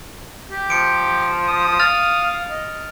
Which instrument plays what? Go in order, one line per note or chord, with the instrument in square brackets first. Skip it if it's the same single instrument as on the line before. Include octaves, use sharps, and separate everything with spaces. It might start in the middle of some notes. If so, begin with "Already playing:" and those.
[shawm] G4
[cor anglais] F3 [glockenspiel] C#7 D7
[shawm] D#6
[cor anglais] F5 [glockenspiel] F6 A6 F7
[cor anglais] D#5